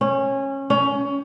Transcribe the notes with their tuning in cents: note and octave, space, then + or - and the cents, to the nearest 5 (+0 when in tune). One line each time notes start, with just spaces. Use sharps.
C#4 -20
C#4 +20